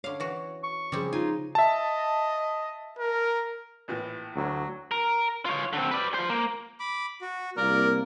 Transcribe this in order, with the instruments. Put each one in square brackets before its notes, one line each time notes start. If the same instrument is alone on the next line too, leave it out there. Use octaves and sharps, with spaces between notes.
[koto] D3 F5 [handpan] C#5
[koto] E3 F#4
[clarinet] C#6
[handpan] C#3 F3 G#4 [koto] G3 C4
[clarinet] D#4 [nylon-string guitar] F4 [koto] G#5
[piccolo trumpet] D#5 [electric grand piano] E5 A5
[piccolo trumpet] A#4
[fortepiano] A#1 A2 E3
[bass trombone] D2 [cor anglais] F#3
[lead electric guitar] A#4
F4 C#5
D3 C4
B4 D5
F3 C5
A#3
[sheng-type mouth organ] B5 D6
F#4
[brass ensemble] C2 A#3 [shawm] A#4 [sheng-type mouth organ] D5